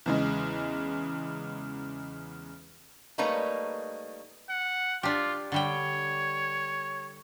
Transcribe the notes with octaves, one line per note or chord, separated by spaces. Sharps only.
E2 C#3 G#3
G3 A3 A#3 D#4 B4 C#5
F#5
D4 F4 G4
D3 G3 C#5 G5